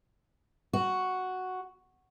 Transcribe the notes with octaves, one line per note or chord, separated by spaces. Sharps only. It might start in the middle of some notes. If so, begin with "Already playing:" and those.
F#4